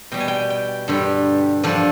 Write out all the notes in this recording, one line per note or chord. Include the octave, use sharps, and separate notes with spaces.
B2 G3 G5
G#5
G5
G5
G2 D3 G3
G2 D3 F3 D5